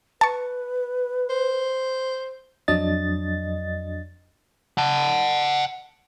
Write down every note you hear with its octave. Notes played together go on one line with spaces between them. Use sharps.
B4 A5 C#6
C5
F2 F#3 D4 D#5 A6
F#5 A5